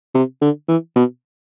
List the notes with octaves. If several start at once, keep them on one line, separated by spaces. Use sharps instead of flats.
C3
D3
E3
B2